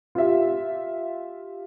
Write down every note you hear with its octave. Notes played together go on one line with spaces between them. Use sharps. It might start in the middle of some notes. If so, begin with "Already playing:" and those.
F4 G4 E5